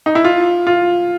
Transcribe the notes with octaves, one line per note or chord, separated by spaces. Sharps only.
D#4
E4
F4
F4